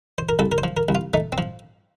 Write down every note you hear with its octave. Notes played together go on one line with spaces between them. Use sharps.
C5
A#4
C2 A4
A#4
C5
F3
A#4
C2
F4
A3 D#4
C4
F3